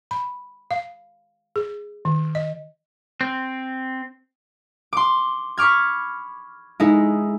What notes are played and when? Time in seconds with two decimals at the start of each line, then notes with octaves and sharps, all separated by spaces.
0.11 B5
0.71 F5
1.56 G#4
2.05 D#3
2.35 D#5
3.21 C4
4.93 C6 D6
5.57 B5 C#6 D6 F6 G#6
6.80 G#3 D#4 E4